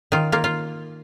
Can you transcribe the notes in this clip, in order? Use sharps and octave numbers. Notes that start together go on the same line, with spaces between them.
D#3 F4
A#3 F4
F4